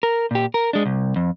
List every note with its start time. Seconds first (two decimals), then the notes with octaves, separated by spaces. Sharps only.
0.03 A#4
0.31 A#2 G4
0.54 A#4
0.73 G#3 D4
0.86 C2
1.16 F2